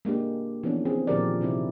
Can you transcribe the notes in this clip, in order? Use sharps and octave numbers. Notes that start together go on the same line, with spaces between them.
G#3 A#3 D4 G4
E3 F3 B3 C#4 D4
C4 G#4
A#2 D#3 F3 G4 A#4 D5
C3 C4 D#4 E4